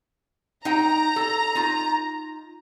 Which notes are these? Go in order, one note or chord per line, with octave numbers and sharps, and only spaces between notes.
D#4 G5 A#5
A4
D#4 F4